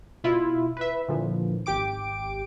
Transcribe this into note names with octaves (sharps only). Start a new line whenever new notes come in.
B2 E4 F4 E5
B4 E5
A#2 D3 E3 F3
G#1 G4 G5 D6 D7